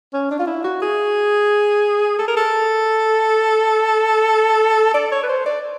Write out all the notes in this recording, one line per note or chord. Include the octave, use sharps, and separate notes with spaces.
C#4
D4
F4
E4
F#4
G#4
A4
A#4
A4
D5
C#5
B4
C5
D5